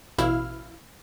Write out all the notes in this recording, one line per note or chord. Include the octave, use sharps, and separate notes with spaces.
A1 B2 E4 F5 F6